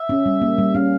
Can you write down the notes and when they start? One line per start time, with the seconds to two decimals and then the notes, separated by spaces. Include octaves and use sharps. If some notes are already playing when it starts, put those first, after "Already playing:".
Already playing: E5
0.09 C#4
0.26 G3
0.41 A#3
0.58 G3
0.75 C#4 F5